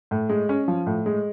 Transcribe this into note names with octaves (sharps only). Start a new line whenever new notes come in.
A2
G#3
C#4
F3
A2
G#3